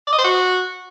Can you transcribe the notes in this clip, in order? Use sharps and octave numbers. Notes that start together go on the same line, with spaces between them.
D5
D#5
C5
F#4